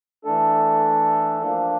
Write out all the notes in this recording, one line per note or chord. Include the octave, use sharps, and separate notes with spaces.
E3 A3 D4 A4
F3 A#3 D4